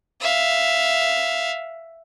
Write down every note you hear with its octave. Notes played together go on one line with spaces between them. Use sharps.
E5 F5